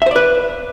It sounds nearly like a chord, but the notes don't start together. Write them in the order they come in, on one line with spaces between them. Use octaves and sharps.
E5 C5 D5 B4